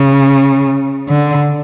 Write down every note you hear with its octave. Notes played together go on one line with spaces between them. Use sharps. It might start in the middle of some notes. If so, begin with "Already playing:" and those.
Already playing: C#3
D3